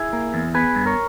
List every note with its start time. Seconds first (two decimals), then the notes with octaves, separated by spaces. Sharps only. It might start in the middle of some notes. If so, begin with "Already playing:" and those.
Already playing: E4 G#4
0.13 A#3
0.34 E2
0.55 B3 G#4 B4
0.76 G2
0.86 A#4 C#5